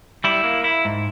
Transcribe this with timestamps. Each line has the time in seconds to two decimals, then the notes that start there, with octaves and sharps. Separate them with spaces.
0.24 G3 E4
0.44 A#3
0.64 E4
0.85 G#2